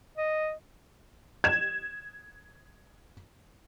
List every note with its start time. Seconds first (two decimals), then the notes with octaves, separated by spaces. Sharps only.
0.17 D#5
1.44 G#6 E7